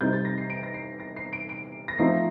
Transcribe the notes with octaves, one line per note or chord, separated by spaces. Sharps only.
C3 G3 C4 D#4 G6
A6
A#6
C7
D7
A#6
C7
A#6
C7
D7
D7
A#6
F3 A3 C4 D#4 C7